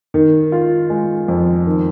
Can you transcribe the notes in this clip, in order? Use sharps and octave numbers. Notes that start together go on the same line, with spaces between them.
D#3
F4
G#3
F2
D#3